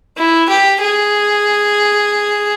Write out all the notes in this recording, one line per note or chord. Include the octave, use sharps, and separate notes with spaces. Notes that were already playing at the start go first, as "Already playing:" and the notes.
E4
G4
G#4